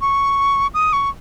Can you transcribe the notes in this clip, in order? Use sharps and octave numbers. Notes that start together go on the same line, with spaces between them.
C#6
D#6
C#6